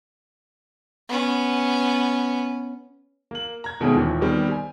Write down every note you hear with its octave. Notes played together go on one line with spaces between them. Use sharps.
B3 C#4
A#3 F#7
A#5 G#6
B2 D#3 G#3 A3 C4 C#4
D#2 A#2 E3
D#3 G3 B3 C4
G#5